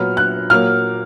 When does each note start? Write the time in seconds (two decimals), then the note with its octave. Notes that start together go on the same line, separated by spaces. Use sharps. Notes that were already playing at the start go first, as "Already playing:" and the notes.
Already playing: A#2 F#3 B3 F6
0.17 F#6
0.50 A#2 F#3 A#3 F6